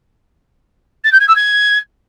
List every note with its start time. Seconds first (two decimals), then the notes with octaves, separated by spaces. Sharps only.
1.04 A6
1.12 G6
1.20 G#6
1.28 E6
1.36 G#6